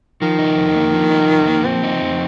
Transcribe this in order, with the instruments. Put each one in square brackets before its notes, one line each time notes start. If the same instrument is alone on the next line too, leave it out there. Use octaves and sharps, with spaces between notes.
[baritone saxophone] D#3 [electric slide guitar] F3
[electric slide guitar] D#4
F2
A#3
F3
D#4
F2
A#3
[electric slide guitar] F3 [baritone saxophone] C4
[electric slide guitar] D#4
F2